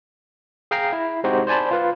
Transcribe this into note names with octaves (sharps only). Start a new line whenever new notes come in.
G#4 F5 G5 A#5 C7
E4
G#3 C4 D#4 F#4 G4 C5
C5 D5 G#5 A5 B5
F4 B4 F5